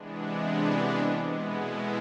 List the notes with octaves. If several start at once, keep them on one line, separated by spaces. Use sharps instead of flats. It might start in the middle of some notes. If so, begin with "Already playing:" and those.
Already playing: C3 E3 G#3 B3 D4
G#4
A4
B2 G#3 B3 E4 G#4
A4